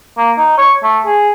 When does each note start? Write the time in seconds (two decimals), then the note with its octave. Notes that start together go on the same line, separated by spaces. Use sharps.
0.17 A#3
0.38 D#4
0.58 C#5
0.83 A3
1.05 G#4